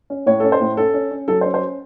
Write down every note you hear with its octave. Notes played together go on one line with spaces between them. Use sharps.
C#4
A2 C#5
C#4 A4
C5
A2
C#4 A4
C#4
C#4
F#3 A4
C5
C#4
C5